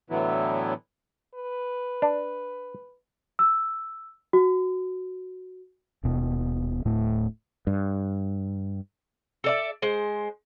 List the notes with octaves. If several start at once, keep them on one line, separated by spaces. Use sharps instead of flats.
A2 D3 E3 F#3 B3 E4
B4
D4
E6
F#4
D#1 B2
D1 A2 A3
G2
A4 D5 E5
G#3 C5